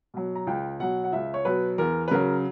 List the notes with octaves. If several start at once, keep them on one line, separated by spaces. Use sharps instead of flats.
B2 F#3
A#5
C#2 G5
B2 F#3 F#5
F#5
C#2 E5
C#5
B2 F#3 B4
E2 A#4
B4
C#3 F#3 A#4